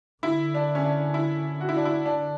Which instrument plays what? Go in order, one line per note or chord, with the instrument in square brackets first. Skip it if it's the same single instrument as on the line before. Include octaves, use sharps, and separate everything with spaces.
[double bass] D3 [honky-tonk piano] E4
[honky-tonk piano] D4
C#4
D4
E4
F#4
E4
D4
E4
[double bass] D3 [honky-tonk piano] D4